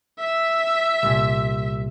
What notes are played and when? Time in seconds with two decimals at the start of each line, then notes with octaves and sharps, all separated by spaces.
0.19 E5
1.03 C2 A#2